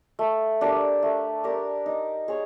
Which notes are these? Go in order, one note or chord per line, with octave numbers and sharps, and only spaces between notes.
A3
D4 G4 A#4
A3
D4 G4 A#4
D#4
G#4 C#5